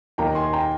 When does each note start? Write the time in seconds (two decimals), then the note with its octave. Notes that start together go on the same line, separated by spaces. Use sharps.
0.18 D#2 D#3 A#3 D#4 G5 A#5
0.35 G#5 C6
0.53 G5 A#5